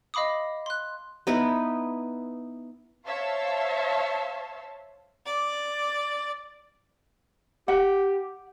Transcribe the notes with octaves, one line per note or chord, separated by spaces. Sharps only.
D#5 F5 B5 D6 D#6
C6 F#6
B3 D#4 E4 B4
C5 C#5 E5 F5 A5
D5
G4 F#5